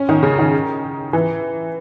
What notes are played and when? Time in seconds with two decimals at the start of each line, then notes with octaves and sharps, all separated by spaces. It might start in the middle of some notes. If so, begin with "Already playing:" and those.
Already playing: C#4
0.09 D#3
0.23 C#3
0.39 D#3
1.13 E3